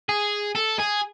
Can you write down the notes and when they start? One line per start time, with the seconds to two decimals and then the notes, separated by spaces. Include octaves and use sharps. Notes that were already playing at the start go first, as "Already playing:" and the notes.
0.09 G#4
0.56 A4
0.79 G#4